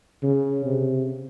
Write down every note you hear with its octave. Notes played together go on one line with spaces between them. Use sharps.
C#3
C3